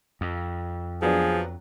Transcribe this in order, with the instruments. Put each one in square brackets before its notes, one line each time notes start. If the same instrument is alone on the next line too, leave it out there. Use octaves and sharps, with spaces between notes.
[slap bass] F2
[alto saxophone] F3 [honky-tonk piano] F#3 B3 D4 [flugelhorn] G#4